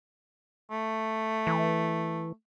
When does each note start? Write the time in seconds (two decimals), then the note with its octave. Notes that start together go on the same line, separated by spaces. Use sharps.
0.71 A3
1.47 E3